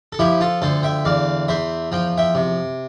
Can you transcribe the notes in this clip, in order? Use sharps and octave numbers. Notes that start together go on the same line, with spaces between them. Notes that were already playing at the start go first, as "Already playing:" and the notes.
A4
F3 E4 G4
F4 A4
D2 A4 C5
E5 G5
E2 D5 F5
E2 C5 E5
F3 G5
E5 G5
C3